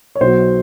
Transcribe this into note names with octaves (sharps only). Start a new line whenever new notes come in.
C#5
B1 B2 F#3 C5